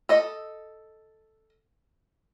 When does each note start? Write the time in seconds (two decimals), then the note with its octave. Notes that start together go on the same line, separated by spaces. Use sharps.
0.09 A4 D#5